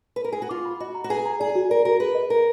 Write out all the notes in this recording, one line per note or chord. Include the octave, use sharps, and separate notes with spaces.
B4
A#4
G#4
F#4
F4 D6
B5
F#4 D#5
A#5
F#4
G#4 B4
A#5
G#4 D5
F#4
A#4 D5
F#4 A#4
G#4 B4
D#5
A#4 B4